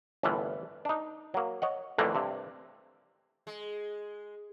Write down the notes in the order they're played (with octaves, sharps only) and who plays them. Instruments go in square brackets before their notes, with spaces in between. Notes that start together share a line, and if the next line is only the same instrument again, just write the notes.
[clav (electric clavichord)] G1 C2 A2 E3 F4 B4
D4 D#4
F#3 A#3
C#5 D#5 F#5
F2 A2 D3 E3 A3 A#3
G2 C3
[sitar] G#3